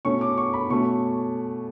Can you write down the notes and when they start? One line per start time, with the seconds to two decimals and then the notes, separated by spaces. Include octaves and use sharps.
0.05 B2 A3 C#4 C#6
0.21 D6
0.38 C#6
0.54 B5
0.70 B2 A3 C#4 C#6